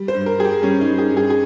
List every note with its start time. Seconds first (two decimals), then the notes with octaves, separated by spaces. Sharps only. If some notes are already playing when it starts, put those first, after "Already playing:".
Already playing: G3
0.08 C5
0.14 G2
0.26 A#4
0.38 G3 G#4
0.44 G4
0.62 G3 C#4
0.81 D#4
0.87 G3
0.98 G#4
1.11 G2
1.17 G#4
1.30 G#4